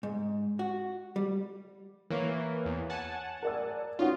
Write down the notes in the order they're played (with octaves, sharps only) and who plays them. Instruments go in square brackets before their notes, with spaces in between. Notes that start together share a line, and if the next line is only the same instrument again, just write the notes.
[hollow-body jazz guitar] G#2
F#4
G3
[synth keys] E3 A#3 [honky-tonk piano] C#5
[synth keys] E2
F#5 G#5 A5
[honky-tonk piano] A#4 D5 E6
[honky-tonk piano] C#4 D#4 F#4 [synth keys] F4